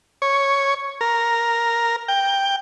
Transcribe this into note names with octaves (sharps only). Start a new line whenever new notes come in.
C#5
A#4
G5